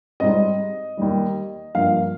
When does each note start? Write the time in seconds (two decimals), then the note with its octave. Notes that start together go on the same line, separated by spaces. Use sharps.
0.20 G#2 G3 C4 D#5
0.97 D#2 D#3 G3
1.75 G2 F3 A#3 F5